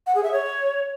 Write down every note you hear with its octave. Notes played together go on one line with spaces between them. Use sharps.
F#5
G#4
E5
C#5